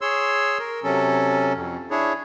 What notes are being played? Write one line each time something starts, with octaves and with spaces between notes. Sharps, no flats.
G#4 C#5 C6 E6
A#4
C3 F#3 C#4 A4
F2
D4 E4 G#4 C#5